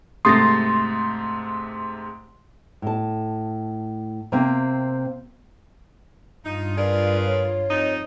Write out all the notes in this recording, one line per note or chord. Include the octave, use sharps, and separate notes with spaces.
G#2 C3 A3 C6 D#6 A6 A#6
A2 A5
C3 A#3 C4
G2 D#4 F4
G#4 A#4 B4 D5
C#5
F2 D#4